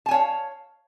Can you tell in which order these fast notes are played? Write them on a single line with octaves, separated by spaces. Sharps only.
A5 G#5 C#5 F5